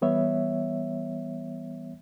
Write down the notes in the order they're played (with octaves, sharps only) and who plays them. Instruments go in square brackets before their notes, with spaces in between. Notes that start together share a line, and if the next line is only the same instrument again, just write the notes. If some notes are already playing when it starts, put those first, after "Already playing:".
[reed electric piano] E3 G3 B3 C#5 E5